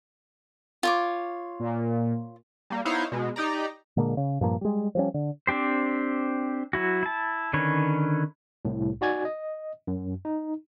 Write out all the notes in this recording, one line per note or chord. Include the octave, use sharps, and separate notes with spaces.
F4 C#5 D6
A#2
G3 A#3
B3 D#4 E4 C5 C#5 F5
B2 G#3
D#4 G4 D5 A#5
A#2 D3 G#3 A#3
C#3
G2 A#2 F3 A#3
G3 G#3
F3 G3 C#4
D3
C4 D4 G4 C5
F#3 E4 F#4
E4 A5
D3 D#3 C#4 B4 C#5
C2 A2
D#4 F#4 D5 G#5 G#6
D#5
F#2
D#4